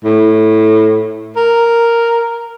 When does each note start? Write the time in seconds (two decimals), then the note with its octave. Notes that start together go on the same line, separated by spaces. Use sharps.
0.04 A2
1.36 A#4